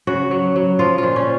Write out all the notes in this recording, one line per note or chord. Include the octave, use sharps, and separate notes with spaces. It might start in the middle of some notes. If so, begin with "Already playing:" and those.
C#3 F#4
F#3
F#3
F3 F4
A#2 F4
C#4